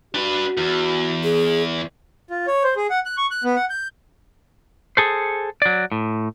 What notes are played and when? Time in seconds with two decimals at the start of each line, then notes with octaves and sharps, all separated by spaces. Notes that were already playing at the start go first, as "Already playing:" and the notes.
0.15 D4 F#4 B4
0.57 E2
1.24 G#4
2.30 F4
2.47 C#5
2.64 C5
2.76 G#4
2.90 F#5
3.06 F#6
3.18 C#6
3.31 F#6
3.44 B3
3.56 F#5
3.70 G6
4.97 G#4 A4 C5
5.62 F#3 D5
5.92 A2